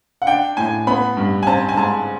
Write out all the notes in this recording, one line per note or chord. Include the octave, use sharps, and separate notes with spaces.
F#5
D4 G5
A2 G#5
B3 B5
G2
G#5
C4 A5
G#5
G#2 A5